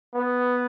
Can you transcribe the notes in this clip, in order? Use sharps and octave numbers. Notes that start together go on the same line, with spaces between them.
B3